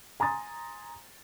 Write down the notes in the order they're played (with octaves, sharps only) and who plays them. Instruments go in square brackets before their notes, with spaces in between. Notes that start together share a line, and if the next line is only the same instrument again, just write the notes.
[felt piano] G#5 A#5 C6 D#6 A6